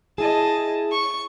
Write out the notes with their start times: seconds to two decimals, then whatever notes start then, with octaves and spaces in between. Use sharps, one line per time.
0.18 E4 G#4 D#5 A5
0.92 C#6